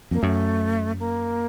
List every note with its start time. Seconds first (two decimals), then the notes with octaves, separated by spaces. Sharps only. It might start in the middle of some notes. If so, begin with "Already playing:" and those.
0.11 F2 A#3
0.22 F#2 A3
1.00 A#3